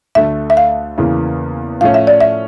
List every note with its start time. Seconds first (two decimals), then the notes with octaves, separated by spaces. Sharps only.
0.15 D2 D3 A3 E5
0.50 E5
0.57 F5
0.98 E2 C#3 E3 A#3
1.81 A2 F3 A3 C#4 F5
1.94 E5
2.07 D5
2.21 E5